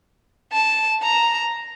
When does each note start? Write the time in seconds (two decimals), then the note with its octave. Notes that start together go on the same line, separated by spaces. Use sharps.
0.53 A5
1.03 A#5